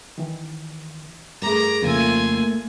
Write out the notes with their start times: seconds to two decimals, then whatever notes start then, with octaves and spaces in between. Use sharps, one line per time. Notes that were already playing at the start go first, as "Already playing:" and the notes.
0.18 D#3 E3
1.42 G2 A3 G#4 A#4 A#5 D6
1.82 F2 C#3 A3 A#3 F4 A#4 G#5 E6